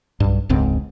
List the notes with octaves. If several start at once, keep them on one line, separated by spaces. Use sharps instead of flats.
B1 G2
E1 C#2 G#2 C4